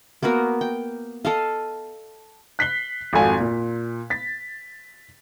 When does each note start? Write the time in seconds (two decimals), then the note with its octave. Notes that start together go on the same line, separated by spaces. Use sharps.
0.23 A#3 B3 F#4 A#4
0.61 G5
1.25 A4 D#5 F5
2.59 F#6 B6 C7 G7
3.13 G#1 F2 F#4 A4 F5 G#5
3.40 A#2
4.10 A6 B6